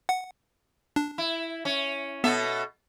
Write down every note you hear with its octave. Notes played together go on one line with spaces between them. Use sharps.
F#5
D4
E4
C#4
B2 B3 A4 E5